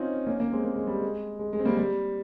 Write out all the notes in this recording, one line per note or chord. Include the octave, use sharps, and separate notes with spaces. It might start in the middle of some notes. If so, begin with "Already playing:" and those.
Already playing: C4 C#4 D#4 F4
A#3 C#4
A#3 C#4
G#3 C4
A#3
G#3
G3
G#3
G#3
G#3
C4
G3 A#3
G3